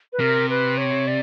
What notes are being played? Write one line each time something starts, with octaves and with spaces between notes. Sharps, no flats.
B4
C3 A#4
B4
C#5
D5